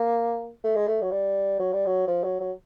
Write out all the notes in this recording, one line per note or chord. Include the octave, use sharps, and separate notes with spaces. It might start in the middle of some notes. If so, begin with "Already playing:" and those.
Already playing: A#3
A3
G#3
A3
F#3
G3
F#3
G3
F#3
F3
F#3
F#3